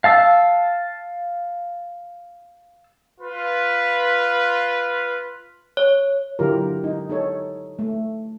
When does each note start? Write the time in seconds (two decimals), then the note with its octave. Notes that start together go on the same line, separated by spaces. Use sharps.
0.04 F5 A5 E6
3.20 F4 B4
5.77 C#5
6.39 D3 F#3 E4 F4 G4 A#4
6.84 D#4
7.10 D#4 A4 C#5
7.79 A3